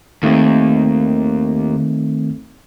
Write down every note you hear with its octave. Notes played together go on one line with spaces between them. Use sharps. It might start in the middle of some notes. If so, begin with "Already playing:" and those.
D#2 D#3 A3 C4